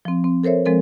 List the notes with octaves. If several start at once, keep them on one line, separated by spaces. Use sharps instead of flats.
F3 C4
C4
A4 A#4 C5 C#5 E5
F3 G#3 C4 A4 A#4